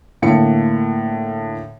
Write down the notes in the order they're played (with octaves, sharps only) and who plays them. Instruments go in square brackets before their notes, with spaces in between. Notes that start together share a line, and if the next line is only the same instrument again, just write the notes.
[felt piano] A2 D3 A#3 C#7